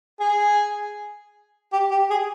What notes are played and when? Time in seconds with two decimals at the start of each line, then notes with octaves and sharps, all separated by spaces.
0.20 G#4
1.72 G4
1.91 G4
2.10 G#4